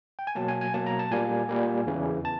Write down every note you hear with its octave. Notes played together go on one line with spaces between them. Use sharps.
G5
G#5
B2 F#3 A#3 A5
G#5
G#5
B2 F#3 A#3 A5
A#5
A5
A#2 G3 A#3 G#5
A#2 G3 A#3
E2 C#3 E3
A5